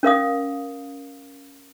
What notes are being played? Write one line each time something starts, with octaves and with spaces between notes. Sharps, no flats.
C#4 A#4 F5 D#6